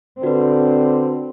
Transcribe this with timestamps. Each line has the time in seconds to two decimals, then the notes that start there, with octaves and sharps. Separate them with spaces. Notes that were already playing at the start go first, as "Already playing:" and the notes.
0.23 D3 C4 F#4 B4